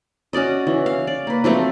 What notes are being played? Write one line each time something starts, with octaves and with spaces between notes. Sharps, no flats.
C#4 F#4 D5 D#5
E3
F5
D5
A#3 B4
F3 F#3 A3 C4